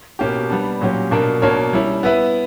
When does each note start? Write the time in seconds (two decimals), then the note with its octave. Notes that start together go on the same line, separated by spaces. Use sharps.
0.19 B2 A#3 C#4 G4
0.50 G3 B3 D4
0.81 A#2 F#3 C#4 G4
1.11 B2 A#3 D4 A#4
1.42 B2 A#3 D4 A#4 C#5
1.73 G3 C#4 E4
2.03 B3 E4 B4 E5